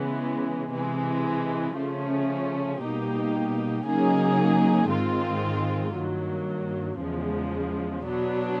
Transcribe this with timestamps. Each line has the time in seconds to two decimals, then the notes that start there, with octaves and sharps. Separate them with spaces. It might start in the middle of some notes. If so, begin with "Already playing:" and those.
Already playing: C#3 E3 G#3 B3
0.71 C3 E3 G#3
1.76 C#3 F3 A3 C#4
2.80 B2 G3 A#3 D#4 G4
3.85 C#3 F#3 A#3 D#4 G#4
4.89 G#2 D#3 G#3 C4 F4
5.93 G2 D#3 F#3 A#3
6.98 E2 C#3 F3 G#3
8.03 B2 F#3 B3 D4